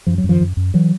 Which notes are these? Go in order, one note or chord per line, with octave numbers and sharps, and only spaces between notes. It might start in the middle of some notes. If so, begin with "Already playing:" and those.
F#2 F3
F#3
F#2
D#3 F3
F#2
F#2
E3 F#3